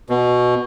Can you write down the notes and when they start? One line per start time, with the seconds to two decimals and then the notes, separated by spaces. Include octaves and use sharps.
0.10 B2